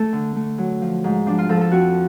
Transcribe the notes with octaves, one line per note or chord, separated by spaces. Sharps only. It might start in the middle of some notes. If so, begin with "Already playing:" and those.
Already playing: A3 A4
D3
A3
F#3
F3
G#2
F3 D4
F4
F3 A4
A4
F2 F#4